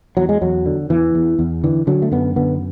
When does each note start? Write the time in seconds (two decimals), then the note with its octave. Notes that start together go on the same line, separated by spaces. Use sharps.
0.17 E2 F#3
0.29 G#3
0.41 E2 F#3
0.66 D3
0.90 E2 E3
1.15 E2
1.39 E2
1.64 D3 E3
1.87 D3 F#3
2.02 A3
2.11 F#2 B3
2.36 D3 B3